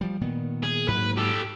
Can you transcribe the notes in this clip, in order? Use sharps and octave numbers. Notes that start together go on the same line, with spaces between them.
F3 G3
A#2 D#3 B3
G#4
G#2 F#3 A#3 B4
G4 A4